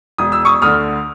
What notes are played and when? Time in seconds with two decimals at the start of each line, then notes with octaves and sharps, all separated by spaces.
0.18 E1 D#6
0.32 E6
0.45 C#6 D#6
0.62 D2 D3 D#6 F6